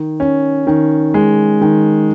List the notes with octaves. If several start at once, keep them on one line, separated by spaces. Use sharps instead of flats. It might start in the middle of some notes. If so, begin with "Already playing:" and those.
Already playing: D#3
C#4
D#3
G#3
D#3